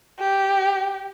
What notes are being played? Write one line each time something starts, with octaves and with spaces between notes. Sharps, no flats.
G4